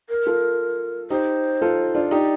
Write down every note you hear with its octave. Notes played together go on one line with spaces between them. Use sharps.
A#4
F4 A4
D#4 G4 C5
F4 A4
D4 F4
D#4 G4 D5